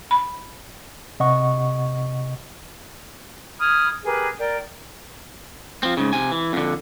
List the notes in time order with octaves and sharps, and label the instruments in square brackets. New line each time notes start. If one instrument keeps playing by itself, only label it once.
[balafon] B5
[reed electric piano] C3 D#5 F#5 C#6
[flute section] B5 D#6 F6 G#6
G4 G#4 A#4 B4
A#4 D5 G5
[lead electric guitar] F3 C4
G#2 C#3
C3 G#5
E3
F2 D3